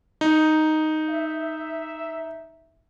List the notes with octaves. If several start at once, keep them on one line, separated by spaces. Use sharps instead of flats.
D#4
E5